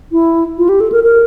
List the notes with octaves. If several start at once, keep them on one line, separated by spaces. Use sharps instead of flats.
E4
F4
G4
A4
A#4
A#4